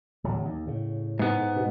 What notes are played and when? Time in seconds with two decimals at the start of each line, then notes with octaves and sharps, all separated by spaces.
0.24 D1 E2 F#3
0.45 D#2
0.67 A2 C#3
1.19 G#2 B3
1.56 B2